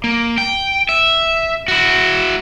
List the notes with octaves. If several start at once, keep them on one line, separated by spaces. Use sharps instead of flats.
A#3
G5
E5
E4 F#4